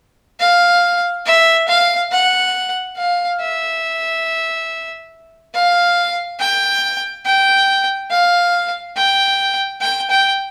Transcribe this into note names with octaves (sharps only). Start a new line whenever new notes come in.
F5
E5
F5
F#5
F5
E5
F5
G5
G5
F5
G5
G5
G5